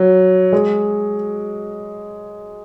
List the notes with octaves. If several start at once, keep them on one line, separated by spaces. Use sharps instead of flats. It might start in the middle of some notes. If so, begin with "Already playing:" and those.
Already playing: F#3
G#3